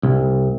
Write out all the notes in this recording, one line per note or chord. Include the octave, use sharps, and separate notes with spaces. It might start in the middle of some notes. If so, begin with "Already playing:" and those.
C2